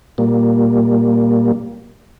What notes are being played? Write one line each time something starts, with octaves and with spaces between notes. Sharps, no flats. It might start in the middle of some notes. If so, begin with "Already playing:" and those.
A#2 G3 A#3